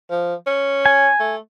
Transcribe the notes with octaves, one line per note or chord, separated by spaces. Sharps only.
F3
C#4
G#5
A3